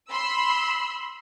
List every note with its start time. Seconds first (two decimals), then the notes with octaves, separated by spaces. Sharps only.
0.11 B5 C6 E6